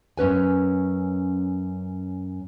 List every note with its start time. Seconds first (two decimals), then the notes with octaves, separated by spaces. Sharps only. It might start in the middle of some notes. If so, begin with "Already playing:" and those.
0.17 F#2 C#4 B4 G#5